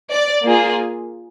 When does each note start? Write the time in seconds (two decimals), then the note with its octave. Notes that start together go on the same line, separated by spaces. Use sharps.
0.11 D5
0.45 A#3 F4 G#4